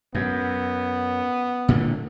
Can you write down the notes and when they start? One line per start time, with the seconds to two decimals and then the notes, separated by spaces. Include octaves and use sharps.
0.15 F#2 B3
1.68 A#2 D3 A3